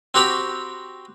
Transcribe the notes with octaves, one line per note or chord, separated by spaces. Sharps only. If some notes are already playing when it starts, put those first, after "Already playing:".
C4 F#4 G4 A#5 B5